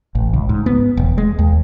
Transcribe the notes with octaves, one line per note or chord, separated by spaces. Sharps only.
A1
C#2
G#2
B3
E1
G#3
D#2